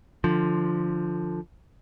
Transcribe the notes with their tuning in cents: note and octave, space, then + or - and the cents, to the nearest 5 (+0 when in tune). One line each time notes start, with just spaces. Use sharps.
D3 +20 F3 +0